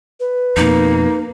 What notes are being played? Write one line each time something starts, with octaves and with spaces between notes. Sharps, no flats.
B4
F2 B2 A#3 D#4